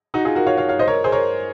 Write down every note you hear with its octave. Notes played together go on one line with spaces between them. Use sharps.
D#4 F#4
F4 G#4
F#4 A#4
C#5 F5
C#5 F5
C#5 F5
C5 D#5
A#4 C#5
G#4 C5
A#4 C#5